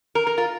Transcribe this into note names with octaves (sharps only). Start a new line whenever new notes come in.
A#4
A#4
F4